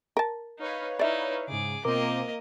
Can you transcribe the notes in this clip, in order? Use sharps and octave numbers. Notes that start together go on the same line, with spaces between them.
A#4 A5
D#4 B4 C#5 F5
D#4 E4 D5 E5
G#2 C#3 G#4 D6
B2 A#3 C4 F4 A#4 C5 D#5 D6